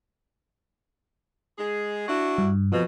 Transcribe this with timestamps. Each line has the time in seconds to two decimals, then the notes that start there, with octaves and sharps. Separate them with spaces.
1.58 G#3 G#4
2.08 D4 E4 F#4
2.38 G2
2.72 F2 B2 F3